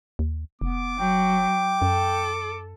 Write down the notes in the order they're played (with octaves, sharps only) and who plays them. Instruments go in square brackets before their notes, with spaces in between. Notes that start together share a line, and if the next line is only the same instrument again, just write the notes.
[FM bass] D#2
[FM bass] F1 [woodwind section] B3 [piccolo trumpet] D6
[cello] F#3 [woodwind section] G5
[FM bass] F#2 [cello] A4